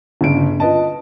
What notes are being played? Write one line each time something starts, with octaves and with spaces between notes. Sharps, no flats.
G1 C#3 D7
F4 B4 D#5 A5